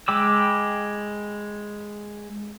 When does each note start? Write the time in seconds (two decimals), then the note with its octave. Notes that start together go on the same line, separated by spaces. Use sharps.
0.08 G#3 G5 B5 D6 E6